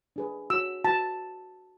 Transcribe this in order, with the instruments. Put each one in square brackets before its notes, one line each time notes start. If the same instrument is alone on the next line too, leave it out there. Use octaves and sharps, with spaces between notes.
[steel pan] D4 G#4 B4
F#4 C#5 E6
F#4 B4 A5